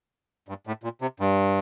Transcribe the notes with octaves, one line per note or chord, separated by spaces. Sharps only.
G2
A2
A#2
C3
G2